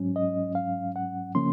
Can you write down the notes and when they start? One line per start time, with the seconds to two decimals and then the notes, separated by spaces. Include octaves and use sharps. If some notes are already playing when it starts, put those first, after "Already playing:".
Already playing: G#2 F#3 C#4
0.16 D#5
0.55 F5
0.96 F#5
1.35 C#3 F3 A#3 C#4 C6